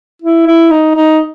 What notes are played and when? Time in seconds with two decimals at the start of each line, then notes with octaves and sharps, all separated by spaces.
0.22 E4
0.46 E4
0.71 D#4
0.95 D#4